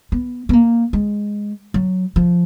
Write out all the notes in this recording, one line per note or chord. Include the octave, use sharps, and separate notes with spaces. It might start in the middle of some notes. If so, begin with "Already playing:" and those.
B3
B3
A#3
G#3
F#3
F3